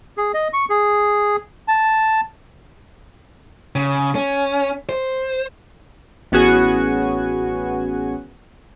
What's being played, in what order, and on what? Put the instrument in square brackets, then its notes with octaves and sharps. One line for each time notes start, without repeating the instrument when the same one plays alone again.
[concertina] G#4
D#5
C#6
G#4
A5
[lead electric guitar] C#3
C#4
C5
[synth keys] A1 B3 C#4 F#4 G#4 G#5